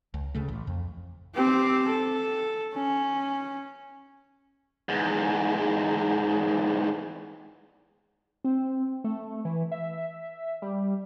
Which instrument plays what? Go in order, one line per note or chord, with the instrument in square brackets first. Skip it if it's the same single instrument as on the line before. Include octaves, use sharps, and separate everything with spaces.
[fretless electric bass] C#2
C#2 C#3 A3
A1
F2
[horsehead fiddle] C4 G4
A4
C#4
[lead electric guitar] E2 G#2
[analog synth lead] C4
A3
E3
E5
G3